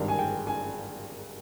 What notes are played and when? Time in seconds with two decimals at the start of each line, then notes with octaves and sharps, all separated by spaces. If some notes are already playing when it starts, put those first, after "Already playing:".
Already playing: G#1 G2 D#3
0.08 G#5
0.19 G5
0.47 G#5